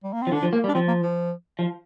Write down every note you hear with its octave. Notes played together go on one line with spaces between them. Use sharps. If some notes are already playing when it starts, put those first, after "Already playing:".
G3
A#3
C4
F3
D3 D4
F3
A#3
G3
D4
F3 C4
A#3
F3
F3